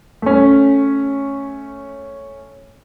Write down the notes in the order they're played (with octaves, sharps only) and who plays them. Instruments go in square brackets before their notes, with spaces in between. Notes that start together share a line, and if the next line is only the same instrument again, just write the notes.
[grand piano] A3 C#4